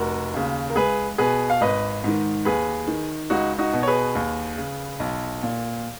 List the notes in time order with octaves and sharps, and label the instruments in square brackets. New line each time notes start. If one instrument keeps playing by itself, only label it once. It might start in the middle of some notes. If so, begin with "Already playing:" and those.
Already playing: [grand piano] F1 F#4 A#4
D#2 C#3
A#4
C#2 G#4 B4
B2 G#4 B4
F5
G#1 B4 D#5
G#2 D#3
D#2 G#4 B4
D#3
C#2 D#4 F#4
D#4 F#4
B2
C#5
G#4 B4
D#2
C#3
B1
A#2